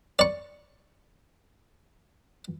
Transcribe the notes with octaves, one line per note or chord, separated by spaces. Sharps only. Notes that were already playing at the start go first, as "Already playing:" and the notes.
D5 C#6